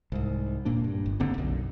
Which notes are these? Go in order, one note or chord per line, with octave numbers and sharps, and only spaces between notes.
C2 G#2
D1 A#2 A#3 D4
G2
G1
F1 D3 A#3 C4
B1 F#2